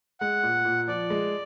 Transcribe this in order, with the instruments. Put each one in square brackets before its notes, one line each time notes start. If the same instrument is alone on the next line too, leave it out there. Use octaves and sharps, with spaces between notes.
[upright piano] G#3 [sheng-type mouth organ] F#5
[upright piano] A#2
A#2
[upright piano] F3 [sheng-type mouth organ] D5
[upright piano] G#3